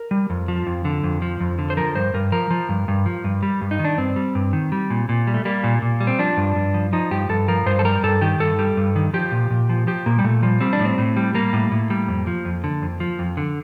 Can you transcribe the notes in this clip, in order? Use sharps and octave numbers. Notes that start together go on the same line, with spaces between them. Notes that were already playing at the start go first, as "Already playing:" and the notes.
Already playing: A#4
G3
F2
F3
F2
D3
F2
F3
F2
D3
C5
F3 A#4
G2 C5
G2 A#4
F3 A#4
F3
G2
G2
F3
G2
G3
G2
D#4
D#3
D4
G2 C4
G3
G2
D#3
G3
A#2
A#2
G3
A3
G3 A#3
A#2
A#2
G3
C4
F3 D4
G2
G2
F3
F3 D#4
G2 G4
G2 A4
F3 A#4
G2 C5
A4
G3 A#4
G2 A4
D#3 G4
G2 A4
G3
G2
D#3
F3 G4
A#2
A#2
F3
F3 G4
A#2 A#3
G3
A#2 A3
F3 G3
G3 C4
D4
A2
C4
A2
G3
G3 A#3
A2
A2
G3
F2
F3
F2
D3
F2
F3
F2
D3